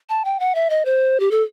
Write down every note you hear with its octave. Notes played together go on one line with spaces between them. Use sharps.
A5
G5
F#5
E5
D#5
C5
G4
A4